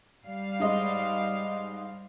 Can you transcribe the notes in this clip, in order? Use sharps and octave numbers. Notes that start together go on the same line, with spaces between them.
G3 F5
G#2 G#3 D#5